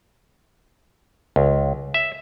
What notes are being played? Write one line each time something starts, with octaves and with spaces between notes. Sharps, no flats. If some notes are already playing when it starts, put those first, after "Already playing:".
C#2
E5